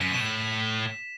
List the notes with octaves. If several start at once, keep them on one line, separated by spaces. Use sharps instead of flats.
F#2 B6
B2 E7
A2
E7